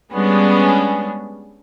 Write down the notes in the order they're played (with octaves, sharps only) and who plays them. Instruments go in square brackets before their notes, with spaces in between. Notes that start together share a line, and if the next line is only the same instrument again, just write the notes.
[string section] G3 G#3 B3 C#4 D4